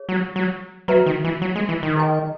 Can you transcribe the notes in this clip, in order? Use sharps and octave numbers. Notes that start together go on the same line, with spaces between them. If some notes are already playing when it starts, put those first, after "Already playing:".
Already playing: G#4 C#5
F#3
F#3
F#3 F#4 B4 E5 A#5
D#3
E3
F#3
G#3
E3
D#3
G#4 D#5 G#5